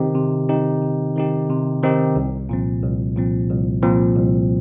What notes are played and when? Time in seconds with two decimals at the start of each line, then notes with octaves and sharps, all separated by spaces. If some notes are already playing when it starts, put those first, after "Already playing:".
Already playing: C3 D#3 C4 D#4 G4
0.15 C3
0.49 D#3 C4 D#4 G4
0.82 C3
1.16 D#3 C4 D#4 G4
1.49 C3
1.83 D#3 C4 D#4 G4
2.16 C2
2.49 A#2 F3 C4
2.83 C2
3.16 A#2 F3 C4
3.49 C2
3.83 A#2 F3 C4
4.16 C2